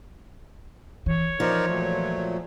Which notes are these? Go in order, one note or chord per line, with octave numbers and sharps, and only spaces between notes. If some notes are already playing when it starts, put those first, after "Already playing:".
E3 C#5
F3 D#4 A#4 D5
A#2 F#3 A3